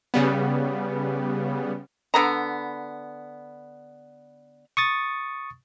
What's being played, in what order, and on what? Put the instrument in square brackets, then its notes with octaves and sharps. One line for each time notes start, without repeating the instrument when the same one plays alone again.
[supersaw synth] C#3 G3 B3
[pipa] D3 B3 A#5
[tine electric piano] C#6 D#6 A6